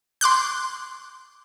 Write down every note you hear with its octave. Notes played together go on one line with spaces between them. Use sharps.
C6 D6 F#6 G6